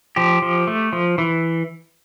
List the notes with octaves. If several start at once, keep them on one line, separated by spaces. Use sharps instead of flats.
F3 G4
F3
A3
F3
E3